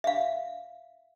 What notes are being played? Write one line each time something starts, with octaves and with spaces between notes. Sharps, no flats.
E5 F5